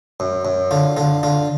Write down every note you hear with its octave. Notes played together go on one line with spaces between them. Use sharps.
F#2
F#2
D3 F4
D3 F4
D3 F4